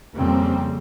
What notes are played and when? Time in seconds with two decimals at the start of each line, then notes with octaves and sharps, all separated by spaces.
0.16 F2 C#3 G3 A#3 C4